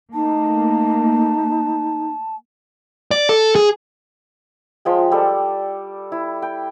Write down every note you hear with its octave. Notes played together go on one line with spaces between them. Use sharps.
A3 A#3 D#4 A5
D5
A4
G#4
F3 G#3 G5
G3 A4 D5
E4
G5